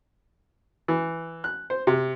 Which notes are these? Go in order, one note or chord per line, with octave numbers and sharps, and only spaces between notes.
E3
F#6
C5
C3